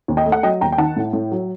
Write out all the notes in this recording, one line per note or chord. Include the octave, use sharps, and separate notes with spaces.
D#2
D#5 G5
A3
F#5
F#3 D#5 G5
D#2 G5 A#5
G5
D#3 F#5 A5
A2
A2
F#3